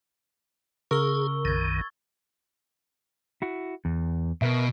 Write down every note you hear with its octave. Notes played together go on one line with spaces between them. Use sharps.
C#3 G#4 A#4 C#6 E6 G7
B1 F#2 D#3 G#6 A6
E4 F#4
E2
B2 A#4 B4 E5